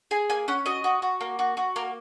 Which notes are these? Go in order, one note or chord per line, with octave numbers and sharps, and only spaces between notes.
G#4 G#5
A#3 G#5
C#4 F#5
F#4 D#5
F#4
F#4
A#3
F#4
F#4
A#3 A#4